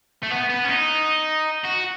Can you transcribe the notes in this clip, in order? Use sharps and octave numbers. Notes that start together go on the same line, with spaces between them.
A3
B3
B3
C#4
D#4
F#4